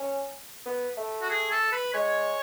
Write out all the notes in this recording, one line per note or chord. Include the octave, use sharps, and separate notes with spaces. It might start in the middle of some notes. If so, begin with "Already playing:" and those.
Already playing: C#4
B3
A3
F#4
G#4
A4
B4
G#3 C#5